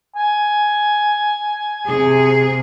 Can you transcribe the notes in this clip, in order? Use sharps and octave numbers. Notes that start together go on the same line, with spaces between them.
G#5
C3 G#4